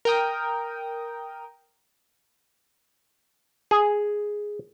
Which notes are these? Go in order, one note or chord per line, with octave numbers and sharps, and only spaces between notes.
A#4 G5 D#6
G#4